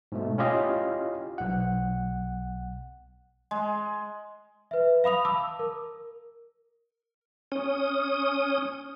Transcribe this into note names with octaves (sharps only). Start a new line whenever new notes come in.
G#2 B2 A3
C#4 E4 F4 G4 D#5 F5
B1 F#5
G#3
B4 E5
F5 B5 D#6 F7
A5 D6 E6
A#4
C#4 D#6